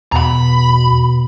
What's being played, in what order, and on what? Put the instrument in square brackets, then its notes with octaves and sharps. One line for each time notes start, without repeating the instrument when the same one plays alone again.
[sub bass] E2 [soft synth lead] B2 [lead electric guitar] A#5 B5